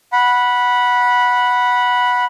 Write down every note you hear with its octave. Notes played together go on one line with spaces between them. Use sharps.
F#5 B5